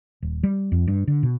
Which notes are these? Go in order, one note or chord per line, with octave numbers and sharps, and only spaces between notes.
D#1
G3
F2
G2
D3
B2